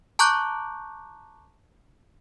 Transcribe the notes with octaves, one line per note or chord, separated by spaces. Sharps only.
A5 A#5 C#6 D6 F#6 G6